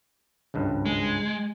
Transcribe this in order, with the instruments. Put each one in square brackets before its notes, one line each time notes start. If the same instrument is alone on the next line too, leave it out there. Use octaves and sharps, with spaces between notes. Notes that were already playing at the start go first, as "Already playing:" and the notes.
[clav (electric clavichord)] G#1 C#2 G2
[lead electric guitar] G#3